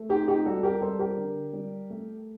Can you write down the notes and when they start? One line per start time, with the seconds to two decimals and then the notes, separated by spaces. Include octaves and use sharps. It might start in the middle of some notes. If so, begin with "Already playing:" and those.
Already playing: A3
0.09 C4 D#4 G4
0.28 D#4 G4
0.45 G3 F#4 A4
0.63 G4 A#4
0.82 G3 A4 C5
0.99 G4 A#4
1.17 D3
1.53 G3
1.90 A3